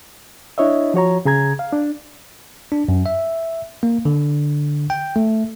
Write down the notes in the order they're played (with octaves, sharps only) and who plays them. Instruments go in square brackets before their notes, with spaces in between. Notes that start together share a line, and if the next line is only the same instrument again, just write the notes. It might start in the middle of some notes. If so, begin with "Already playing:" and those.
[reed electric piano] D4 E4 C#5 D#5 E5
F3 F#4 C#5 A#5
C#3 G#4 A#5 G#6
F5
D4
[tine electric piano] D4
F#2
E5
A#3
D3
G5
A3